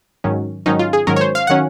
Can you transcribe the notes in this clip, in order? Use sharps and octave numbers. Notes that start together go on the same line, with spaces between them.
G#2 D#3 F#3 C#4
G#2 D#3 F#3 C#4 D#4
F4
G#4
G#2 D#3 F#3 C#4 A#4
C#5
C5
F5
D#3 F#3 C#4 F#5